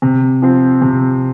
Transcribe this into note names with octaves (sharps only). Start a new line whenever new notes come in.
C3
F3 C4
C3